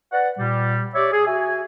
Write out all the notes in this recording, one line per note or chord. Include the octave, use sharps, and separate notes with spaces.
B4 D5 F#5
A#2 G3
G4 C#5 D5 E5
G#4
F#4 E5 G#5